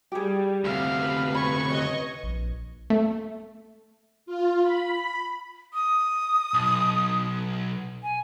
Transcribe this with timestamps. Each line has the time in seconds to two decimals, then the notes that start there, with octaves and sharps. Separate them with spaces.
0.12 G3 G4 G#4
0.64 D2 C3 F5
0.99 B4
1.34 B5 C#6 G#6
1.70 B4 C#5 D#5
2.23 A#1
2.90 A3
4.26 F4
4.63 B5
5.73 D#6
6.54 B1
8.03 G#5